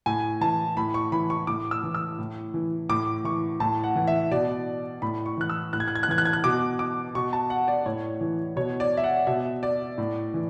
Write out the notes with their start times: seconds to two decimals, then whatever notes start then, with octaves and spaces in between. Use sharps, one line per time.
0.06 A2 G#5
0.41 E3 A5
0.77 A2 B5
0.94 C#6
1.12 E3 B5
1.30 C#6
1.47 A2 D6
1.71 E6
1.83 E3
1.95 E6
2.19 A2
2.54 E3
2.89 A2 D6
3.24 E3 C#6
3.60 A2 A5
3.84 F#5
3.96 E3
4.07 E5
4.31 B2 D5
5.02 A2 B5
5.26 C#6
5.37 E3 F#6
5.50 E6
5.73 A2 F#6
5.80 G#6
5.88 F#6
5.96 G#6
6.03 F#6
6.09 E3 G#6
6.18 F#6
6.25 G#6
6.33 F#6
6.44 B2 D6
6.79 D6
7.15 B2 C#6
7.33 A5
7.50 F#5
7.68 D5
7.86 A2 C#5
8.21 E3
8.56 B2 C#5
8.80 D5
8.97 E5
9.04 F#5
9.27 B2 E5
9.63 D5
9.98 A2
10.34 E3